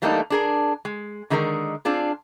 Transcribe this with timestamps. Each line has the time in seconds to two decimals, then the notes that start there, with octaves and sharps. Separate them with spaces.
0.02 E3 G3 A3 A#3 D4 D#4
0.30 D4 G#4 A#4
0.85 G#3
1.30 D3 D#3 G#3 D#4 A#4
1.85 C4 D4 F4 G#4